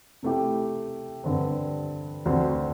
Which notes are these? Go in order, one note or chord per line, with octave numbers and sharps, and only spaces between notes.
C3 A3 E4 G4
G2 D3 C4
D2 D3 C4